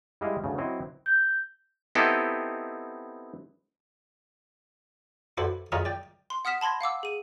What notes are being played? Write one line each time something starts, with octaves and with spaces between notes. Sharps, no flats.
G3 G#3 E4 D#5 F5
D2 C#3
F#3 C4 E4 C#5 D#5
G6
B3 C4 D#4 E4 G4 A4
E4 F#4 A4 B4 C5 D5
F4 G#4 A#4 C#5 D#5 E5
D5 G5
C6
F#5 D#6 F6 B6 E7
A5 B5 C6 G#6 A#6
F5 F#5 D6 E6
G#4 D#7